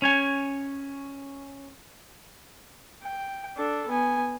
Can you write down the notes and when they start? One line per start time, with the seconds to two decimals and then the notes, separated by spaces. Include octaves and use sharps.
0.02 C#4 C#5 G#5
3.02 G5
3.57 D4 A4
3.88 B3 G#5